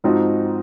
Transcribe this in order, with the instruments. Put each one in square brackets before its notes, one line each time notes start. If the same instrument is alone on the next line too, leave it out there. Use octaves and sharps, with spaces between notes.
[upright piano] G#2 F3 C4 D#4 F#4